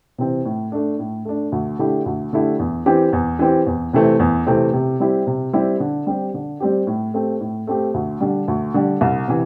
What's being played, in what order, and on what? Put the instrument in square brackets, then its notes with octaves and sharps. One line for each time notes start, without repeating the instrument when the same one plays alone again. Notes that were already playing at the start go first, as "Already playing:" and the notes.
[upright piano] C3 E3 C4
A2
A3 D4
A2
A3 D4
D2
D3 A3 E4 G4
D2
D3 A3 E4 G4
E2
E3 C4 G4
E2
E3 C4 G4
E2
C3 E3 A3 C4
E2
C3 E3 A3 C4
C3
G3 C4 E4 G4
C3
G3 C4 E4 G4
D3
G3 C4 G4
D3
G3 C4 G4
A2
A3 C4 G4
A2
A3 C4 G4
D2
D3 G3
D2
D3 G3
C2
C3 E3